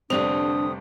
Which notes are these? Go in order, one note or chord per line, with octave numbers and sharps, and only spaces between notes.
F1 D3 G3 C4 D4 D#6 F7